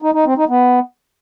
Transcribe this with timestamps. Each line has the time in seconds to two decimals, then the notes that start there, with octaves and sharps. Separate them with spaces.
0.02 D#4
0.14 D#4
0.26 C4
0.37 D#4
0.49 B3